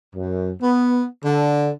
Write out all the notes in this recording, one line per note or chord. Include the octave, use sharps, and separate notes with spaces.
F#2
B3
D3